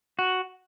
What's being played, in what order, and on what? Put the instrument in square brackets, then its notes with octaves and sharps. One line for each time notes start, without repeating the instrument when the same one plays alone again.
[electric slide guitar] F#4